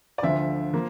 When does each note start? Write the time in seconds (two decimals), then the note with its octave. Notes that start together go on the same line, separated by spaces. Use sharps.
0.18 D5
0.23 D2 D3 F3 E5
0.73 F3 A#3